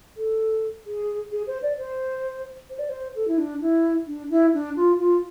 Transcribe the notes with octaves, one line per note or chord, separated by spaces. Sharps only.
A4
G#4
G#4
C5
D5
C5
C5
D5
C5
A4
E4
D4
E4
D4
E4
D4
F4
F4